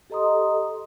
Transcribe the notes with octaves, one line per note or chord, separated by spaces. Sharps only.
G4 A4 D#5 A#5 C6 D#6